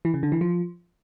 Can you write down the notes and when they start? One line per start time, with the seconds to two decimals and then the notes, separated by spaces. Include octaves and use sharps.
0.05 E3
0.14 C#3
0.23 D3
0.32 E3
0.41 F3